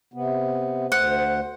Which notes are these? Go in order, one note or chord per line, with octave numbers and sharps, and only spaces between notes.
C3 B3
D2 C5 F#5